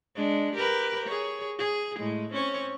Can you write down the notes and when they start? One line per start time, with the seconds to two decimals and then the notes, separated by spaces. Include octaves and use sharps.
0.16 G#3 D4
0.55 G4 A#4 B4
1.07 G#4 C#5
1.59 G#4
1.99 A2 G#3
2.32 C4 C#4 C#5